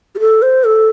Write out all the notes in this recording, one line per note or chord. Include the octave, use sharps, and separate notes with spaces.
G4
A4
C5
A4